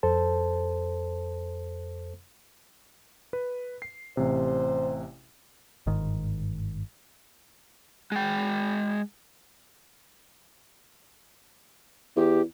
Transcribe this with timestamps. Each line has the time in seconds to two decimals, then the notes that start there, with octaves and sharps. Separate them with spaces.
0.03 F2 A4 C5 A5
3.33 B4
3.82 C7
4.17 A1 C3 C5
5.87 G1 G#2 D#3
8.12 G#3 G5
12.16 E2 G4